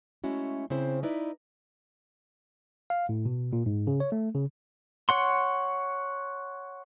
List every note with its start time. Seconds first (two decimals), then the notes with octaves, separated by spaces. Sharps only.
0.24 G#3 A3 C#4 E4 F#4
0.70 C#3 C4 E4 C5
1.03 D#4 E4 B4 D5
2.90 F5
3.09 A2
3.26 B2
3.53 A#2
3.66 G#2
3.87 C#3
4.00 C#5
4.12 A3
4.35 C#3
5.09 C#5 F#5 C6